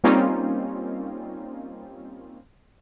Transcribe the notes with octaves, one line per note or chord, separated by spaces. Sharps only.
G3 A#3 C4 C#4 D#4 F4